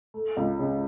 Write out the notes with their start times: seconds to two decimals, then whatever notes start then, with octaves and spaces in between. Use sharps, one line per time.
0.14 A3
0.37 C#2
0.59 C#3